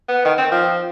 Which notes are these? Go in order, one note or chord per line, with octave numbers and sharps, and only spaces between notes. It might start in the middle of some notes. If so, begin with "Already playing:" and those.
B3
D#3
C4
F3